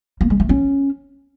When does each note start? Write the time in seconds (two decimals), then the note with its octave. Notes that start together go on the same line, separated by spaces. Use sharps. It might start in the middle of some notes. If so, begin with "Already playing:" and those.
0.21 A#3
0.30 G#3
0.40 A3
0.49 C#4